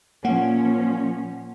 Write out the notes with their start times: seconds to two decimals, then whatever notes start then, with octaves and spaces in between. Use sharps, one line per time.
0.25 A#2 F3 A#3 C#4 F#5